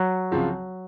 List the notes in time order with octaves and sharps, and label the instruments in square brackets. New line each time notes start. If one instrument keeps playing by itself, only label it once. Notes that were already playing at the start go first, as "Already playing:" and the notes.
Already playing: [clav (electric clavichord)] F#3
[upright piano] C#2 C#3 F3 C4 F4